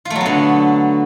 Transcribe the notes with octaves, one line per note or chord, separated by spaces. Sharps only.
F4
A3
F#3
B3
D3